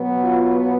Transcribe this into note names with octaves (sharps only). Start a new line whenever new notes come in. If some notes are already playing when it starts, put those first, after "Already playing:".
Already playing: B2 F#3 B3
F4